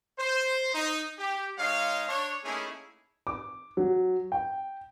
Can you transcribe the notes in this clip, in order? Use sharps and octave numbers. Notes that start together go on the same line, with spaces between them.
C5
D#4
G4
G#3 D#4 C#5 F5
D4 C#5
A3 A#3 C#4 D#4 E4 G#4
D6
F#3
G5